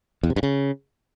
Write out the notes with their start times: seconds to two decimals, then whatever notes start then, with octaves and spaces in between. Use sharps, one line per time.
0.23 E2
0.30 C3
0.36 G2
0.43 C#3